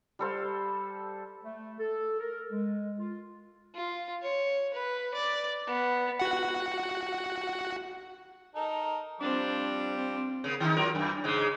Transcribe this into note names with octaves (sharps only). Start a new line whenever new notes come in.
G3 A4 C5 F5
A3
A4
A#4
G#3
F4
F4
C#5
B4
D5
B3
F#4 F#5
D#4 A4 A#4
F3 G3 C4 D4 D6
C4
C#3 A#3
D#3 D#4
F#3 F4 A#4
F#2
G#2 C#3 G#3